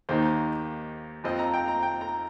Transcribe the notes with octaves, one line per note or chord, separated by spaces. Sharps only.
D#2 D#3 A#3 D#4 C5
F2 F3 C4 D#5
A#5
G5
A#5
G5
A#5